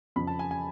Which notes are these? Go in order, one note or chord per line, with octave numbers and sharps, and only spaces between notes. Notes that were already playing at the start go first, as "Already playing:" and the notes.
F2 C#3 F3 B5
A5
G#5
G#5